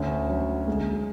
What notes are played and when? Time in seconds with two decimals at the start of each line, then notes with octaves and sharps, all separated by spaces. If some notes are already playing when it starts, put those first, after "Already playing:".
Already playing: D2 C#4
0.30 F#3
0.67 G#3